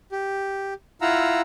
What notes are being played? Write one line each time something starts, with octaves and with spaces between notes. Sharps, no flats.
G4
E4 F4 F5 F#5 A#5 E6